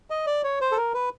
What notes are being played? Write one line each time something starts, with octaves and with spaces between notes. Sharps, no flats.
D#5
D5
C#5
C5
A4
A#4
B4